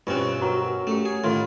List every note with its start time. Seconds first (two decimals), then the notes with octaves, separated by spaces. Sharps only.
0.07 G2 B2 C4 C#4 F4 C5
0.41 F#3 F#4 A#4 A#5 C#6
0.87 A3 C#4 G4
1.05 G#4
1.24 A2 D#3 F4 B4 B5